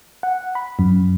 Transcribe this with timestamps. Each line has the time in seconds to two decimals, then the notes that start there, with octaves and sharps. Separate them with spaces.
0.23 F#5
0.55 B5
0.79 F#2